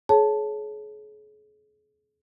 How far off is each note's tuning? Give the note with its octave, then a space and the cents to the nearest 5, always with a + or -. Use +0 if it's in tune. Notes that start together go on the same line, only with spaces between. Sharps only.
G#4 +35 C#5 +0 A5 +0